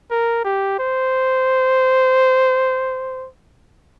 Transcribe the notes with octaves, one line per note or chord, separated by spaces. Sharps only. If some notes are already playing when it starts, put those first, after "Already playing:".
A#4
G4
C5